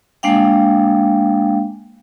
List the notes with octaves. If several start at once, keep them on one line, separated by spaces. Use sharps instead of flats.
G#3 A#3 D4 F5 G5